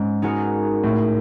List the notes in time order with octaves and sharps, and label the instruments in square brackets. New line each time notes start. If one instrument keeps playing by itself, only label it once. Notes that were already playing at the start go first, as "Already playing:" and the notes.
Already playing: [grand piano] G#2 [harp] C#4
[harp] G#3 B3 D#4 F#4 A#4
[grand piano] A2